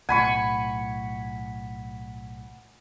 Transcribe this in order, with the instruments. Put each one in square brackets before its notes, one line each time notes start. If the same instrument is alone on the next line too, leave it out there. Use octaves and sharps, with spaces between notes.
[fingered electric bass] B1 A2 [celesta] F#5 [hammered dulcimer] G#5 B5 C#6